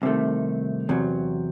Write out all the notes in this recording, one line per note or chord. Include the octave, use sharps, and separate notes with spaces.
C2 C3 D#3 A3
E2 C3 F#3